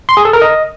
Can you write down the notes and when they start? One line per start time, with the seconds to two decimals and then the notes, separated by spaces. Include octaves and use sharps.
0.09 C6
0.17 G#4
0.25 A4
0.33 A#4
0.42 D#5